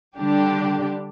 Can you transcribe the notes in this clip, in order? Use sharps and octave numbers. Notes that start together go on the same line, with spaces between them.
D3 G3 D4 G4